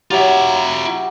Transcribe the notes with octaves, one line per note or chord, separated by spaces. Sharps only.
F#3 F4 G4 E5